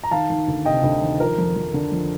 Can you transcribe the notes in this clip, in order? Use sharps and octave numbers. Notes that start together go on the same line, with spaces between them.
A#5
D#3 F5 A5
D#3
D2
C3 D#5 G5
D2
D#3
F3 A#4
F2
F2
D3
F2